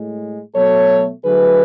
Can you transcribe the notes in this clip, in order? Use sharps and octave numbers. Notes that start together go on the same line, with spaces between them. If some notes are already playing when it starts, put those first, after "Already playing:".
Already playing: A2 G#3
B2 F#3 A3 A4 C#5
D3 F#3 A3 G#4 B4